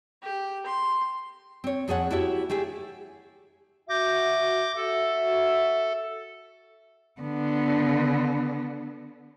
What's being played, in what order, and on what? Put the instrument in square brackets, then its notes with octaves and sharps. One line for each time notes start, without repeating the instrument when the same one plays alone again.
[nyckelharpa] G4
C6
[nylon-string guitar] C4 C#5
F2 G#4 A4 C#5 F#5
E4 F#4 G4 A4 C#5 E5
A3 G4 G#4 E5
[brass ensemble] F#4 E5 [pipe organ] D6 G6 A#6
[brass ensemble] F#4 E5 [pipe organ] A4
[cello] D3 B3